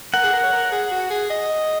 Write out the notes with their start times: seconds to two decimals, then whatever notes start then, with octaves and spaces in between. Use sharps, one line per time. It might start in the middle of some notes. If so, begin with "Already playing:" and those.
0.14 A#4 F#5
0.23 G#4
0.33 A#4
0.43 C#5
0.53 A#4
0.72 G#4
0.91 F#4
1.10 G#4
1.30 D#5